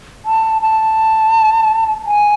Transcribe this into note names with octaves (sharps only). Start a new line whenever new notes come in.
A5
A5
G#5